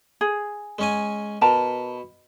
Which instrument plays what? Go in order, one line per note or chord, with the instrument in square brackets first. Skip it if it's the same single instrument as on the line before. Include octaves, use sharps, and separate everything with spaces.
[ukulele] G#4
[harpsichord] G#3 C#4 G#5
[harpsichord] B2 [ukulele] A#4 A5 A#5